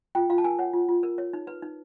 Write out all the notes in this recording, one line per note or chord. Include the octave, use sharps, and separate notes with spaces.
F4 G5
F4 F5
A5
A#4 G#5
C#5 F#5
F4
F4
A#4
C#5
D#4
B4
D#4